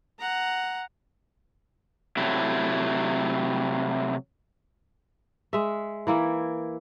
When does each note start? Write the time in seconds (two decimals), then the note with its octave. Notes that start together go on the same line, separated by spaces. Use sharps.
0.19 F#5 A#5
2.17 C3 F#3 A3 E4
5.53 G#3 E5
6.07 E3 A#3 E4